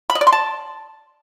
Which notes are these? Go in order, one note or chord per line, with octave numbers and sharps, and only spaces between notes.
B5
D#5
D5
C6
A5